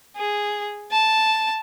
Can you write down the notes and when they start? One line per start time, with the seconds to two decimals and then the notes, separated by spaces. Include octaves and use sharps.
0.16 G#4
0.91 A5